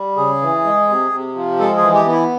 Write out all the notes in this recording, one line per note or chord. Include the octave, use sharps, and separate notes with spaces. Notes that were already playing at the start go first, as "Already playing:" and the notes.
Already playing: G3
C#3 G#4
E3
G#3
C3
C3
F3
G#3 A4
G#4
E3
G4
B3
E4